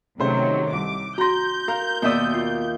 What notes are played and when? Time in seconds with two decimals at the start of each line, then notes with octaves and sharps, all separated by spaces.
0.20 C3 D#3 F#3 A3 C#4 C5
0.73 C2 D6
1.18 F#4 A#5 C6 G6 A#6
1.68 A#4 F5
2.02 D#2 B2 D5 E5 D#6
2.34 F4